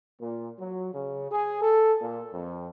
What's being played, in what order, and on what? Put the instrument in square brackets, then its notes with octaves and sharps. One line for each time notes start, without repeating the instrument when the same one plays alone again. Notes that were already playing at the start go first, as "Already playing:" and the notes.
[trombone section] A#2
F#3
C#3
G#4
A4
A#2
F2